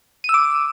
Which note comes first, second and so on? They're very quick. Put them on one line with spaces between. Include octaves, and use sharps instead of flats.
D#7 E6 D6